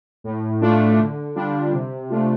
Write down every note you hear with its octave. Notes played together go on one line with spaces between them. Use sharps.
A2
A3 D4 F4
D3
G3 D4 F4
C3
A3 D4 F4